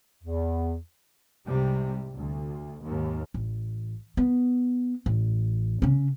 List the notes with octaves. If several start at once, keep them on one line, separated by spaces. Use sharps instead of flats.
E2
C2 G#2 C3 G3
D2
D#2 G#2
A1
B3
A1
C#3 C#4